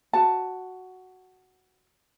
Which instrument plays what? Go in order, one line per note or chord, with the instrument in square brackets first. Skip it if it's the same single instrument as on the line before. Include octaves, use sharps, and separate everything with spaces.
[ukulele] F#4 A5